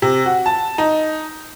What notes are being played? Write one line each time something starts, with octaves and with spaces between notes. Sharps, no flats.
C3
F#4
A5
D#4